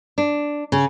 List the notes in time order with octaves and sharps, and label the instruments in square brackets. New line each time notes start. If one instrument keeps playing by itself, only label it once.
[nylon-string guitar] D4
C#3